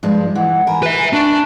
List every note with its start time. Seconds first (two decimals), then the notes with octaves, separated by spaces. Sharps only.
0.03 G2 F3 G#3
0.35 E3 D#5 F#5
0.67 A#4 G#5 B5
0.83 B4 E5
1.13 D4 A5 C#6